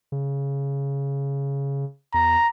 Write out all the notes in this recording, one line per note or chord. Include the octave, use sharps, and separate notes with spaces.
C#3
E2 A#5